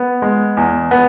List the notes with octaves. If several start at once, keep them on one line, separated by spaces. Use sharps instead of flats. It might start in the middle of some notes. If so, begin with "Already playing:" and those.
Already playing: B3
G#3
E2
B3